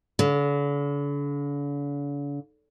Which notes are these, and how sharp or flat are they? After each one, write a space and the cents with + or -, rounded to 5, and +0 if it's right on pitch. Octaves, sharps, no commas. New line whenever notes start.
D3 -45